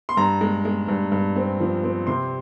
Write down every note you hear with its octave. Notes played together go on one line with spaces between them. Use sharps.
C6
G2 A#5
G#3
G#3
G2
G2
C4
F3
C4
C3 C6